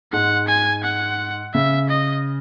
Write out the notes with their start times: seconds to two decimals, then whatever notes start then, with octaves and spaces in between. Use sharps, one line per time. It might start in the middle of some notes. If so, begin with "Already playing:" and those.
0.13 G#2 G#3 F#5
0.48 G#5
0.83 F#5
1.54 C#3 E5
1.89 D#5